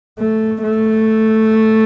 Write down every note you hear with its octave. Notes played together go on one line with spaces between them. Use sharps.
A3
A3